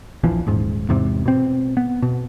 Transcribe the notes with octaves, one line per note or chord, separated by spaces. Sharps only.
A#1 E2 E3 F3
D#1 G#2
E2 G#2 C3
B2 C4
B3
B2